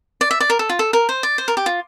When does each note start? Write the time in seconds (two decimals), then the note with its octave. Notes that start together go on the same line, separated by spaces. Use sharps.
0.21 D5
0.31 E5
0.40 D5
0.50 A#4
0.59 A4
0.69 F4
0.79 A4
0.93 A#4
1.09 C5
1.23 D5
1.38 C5
1.48 A#4
1.57 G4
1.66 F4